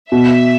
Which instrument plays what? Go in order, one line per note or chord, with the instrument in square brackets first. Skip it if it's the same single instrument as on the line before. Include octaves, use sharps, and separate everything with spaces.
[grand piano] B2 [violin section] E5